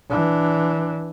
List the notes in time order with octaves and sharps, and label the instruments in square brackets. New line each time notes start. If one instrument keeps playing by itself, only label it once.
[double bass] E3 D4